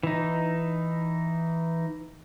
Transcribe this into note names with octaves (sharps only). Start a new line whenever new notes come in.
E3 D#4